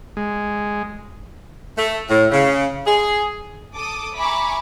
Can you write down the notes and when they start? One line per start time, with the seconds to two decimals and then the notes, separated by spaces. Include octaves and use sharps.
0.17 G#3
1.77 A3
2.09 A2
2.31 C#3
2.86 G#4
3.73 A4 D6 D#6
4.17 E5 G#5 A#5 B5 C#6 D6